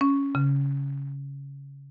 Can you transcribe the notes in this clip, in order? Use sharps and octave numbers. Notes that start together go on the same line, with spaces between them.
C#4
C#3